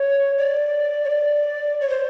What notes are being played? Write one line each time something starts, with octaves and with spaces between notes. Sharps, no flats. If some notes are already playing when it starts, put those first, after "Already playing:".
Already playing: C#5
D5
C#5
D5
C#5
C5